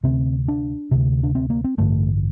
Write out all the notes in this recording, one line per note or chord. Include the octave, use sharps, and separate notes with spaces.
D2 C3 C4
D4
D2 C3
D4
C4
A#3
C4
A1 G2 D3 A3